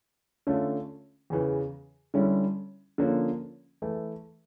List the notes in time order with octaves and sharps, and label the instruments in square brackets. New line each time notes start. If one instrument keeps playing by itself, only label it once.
[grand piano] D3 A3 C#4 F4
E2 C#3 E3
D3 G3 C#4 E4
D3 F3 A#3 C#4
E3 A3 E4